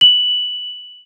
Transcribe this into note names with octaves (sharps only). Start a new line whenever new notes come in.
F#7